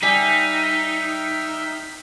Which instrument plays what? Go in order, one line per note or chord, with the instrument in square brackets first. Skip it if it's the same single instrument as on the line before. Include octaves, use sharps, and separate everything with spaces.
[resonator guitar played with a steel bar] G3 G#5 [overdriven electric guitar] D#4 [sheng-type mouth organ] E5 G5 F6 [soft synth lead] B6